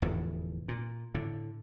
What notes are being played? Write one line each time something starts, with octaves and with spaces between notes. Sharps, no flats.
F1 E2 A2 D3
A#2
A2 D3